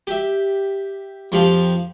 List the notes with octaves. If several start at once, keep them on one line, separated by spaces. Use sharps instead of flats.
G4 E5
F2 F3 G4 F5